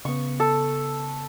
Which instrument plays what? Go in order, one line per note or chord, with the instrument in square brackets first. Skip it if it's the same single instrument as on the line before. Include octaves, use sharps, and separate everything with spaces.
[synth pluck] C#3 B3 [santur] C#6
[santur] A4